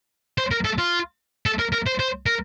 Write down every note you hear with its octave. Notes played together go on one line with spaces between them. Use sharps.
C5
A#4
A4
F4
A4
A#4
A#4
C5
C5
A#4